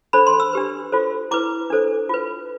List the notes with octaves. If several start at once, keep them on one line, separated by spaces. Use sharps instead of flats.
D4 A4 C5 B5
C6
E6
D4 G4 B4
F4 A4 C5
E4 B4 D6
D4 A4 C5
F4 B4